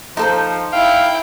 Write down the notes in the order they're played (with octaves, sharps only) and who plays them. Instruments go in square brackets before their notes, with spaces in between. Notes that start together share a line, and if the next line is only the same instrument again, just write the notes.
[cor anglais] F3 [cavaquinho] D#4 A4 C5
[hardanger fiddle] E4 G5 [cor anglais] F5